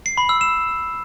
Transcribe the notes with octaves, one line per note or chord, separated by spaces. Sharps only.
C7
B5
E6
E7